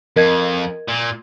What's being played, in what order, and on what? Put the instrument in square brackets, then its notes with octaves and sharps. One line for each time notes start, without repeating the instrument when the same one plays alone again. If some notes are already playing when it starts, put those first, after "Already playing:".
[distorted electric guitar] F2 [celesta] A#4 D#5 G#6
[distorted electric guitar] A#2